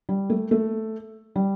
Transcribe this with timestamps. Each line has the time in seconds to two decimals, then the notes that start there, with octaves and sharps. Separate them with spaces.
0.09 G3
0.30 A3
0.51 A3
1.36 G3